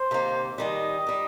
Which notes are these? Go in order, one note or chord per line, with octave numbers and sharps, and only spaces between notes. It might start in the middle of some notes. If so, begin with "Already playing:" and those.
Already playing: C5
C3 D#3 A#3
D#2 D#3 G3 D#5
D#3 G3